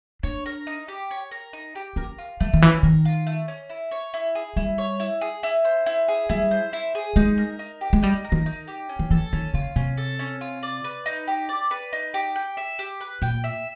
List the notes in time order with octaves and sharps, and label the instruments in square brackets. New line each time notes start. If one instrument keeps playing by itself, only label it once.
[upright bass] D4 [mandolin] C#5
[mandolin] A#4
D#4
G4
C#5
A#4
D#4
G4
[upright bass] C#4 [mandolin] A#4
[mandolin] F4
[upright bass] G3 [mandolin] A3
[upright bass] D#3
[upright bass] E3 [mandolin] C#4
[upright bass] D#3 [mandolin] A#4
[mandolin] F4
A3
C#4
E4
C#5
E4
G#4
[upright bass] G3 [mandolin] E4
[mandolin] C#5
E4
G#4
E4
C5
E4
G#4
[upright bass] G3 [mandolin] E4
[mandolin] C5
E4
G#4
[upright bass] G#3 [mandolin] D#4
[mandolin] A#4
D#4
G4
[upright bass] G#3
[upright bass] G3 [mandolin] D#4
[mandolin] A#4
[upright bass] D#3
[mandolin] D#4
G4
C#4
[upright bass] D#3
[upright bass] E3 [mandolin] A4
[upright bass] D#3 [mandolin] C#4
[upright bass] C#3 [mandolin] F4
[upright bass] C3 [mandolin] C#4
[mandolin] A4
C#4
F4
D5
B4
D#4
G4
D5
B4
D#4
G4
G5
E5
G4
B4
[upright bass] A#2 [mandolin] G5
[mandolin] E5